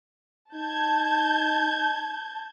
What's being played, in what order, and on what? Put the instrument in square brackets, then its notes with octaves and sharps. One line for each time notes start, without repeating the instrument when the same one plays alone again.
[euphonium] D#4 [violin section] A5 G6 G#6